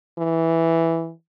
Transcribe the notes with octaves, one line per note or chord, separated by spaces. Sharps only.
E3